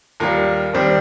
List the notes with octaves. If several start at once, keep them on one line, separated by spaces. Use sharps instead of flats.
D#2 D#3 G3 F4 A#4
D#2 D#3 G3 C4